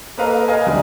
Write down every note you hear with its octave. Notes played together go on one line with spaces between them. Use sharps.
A#3 A4 B4 D#5 F5 A#5
A#4 D#5 F5 G#5
D2 G3 G#3